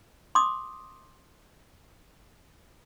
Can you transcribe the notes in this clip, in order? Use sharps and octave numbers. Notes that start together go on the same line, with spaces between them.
C6 D6 D#6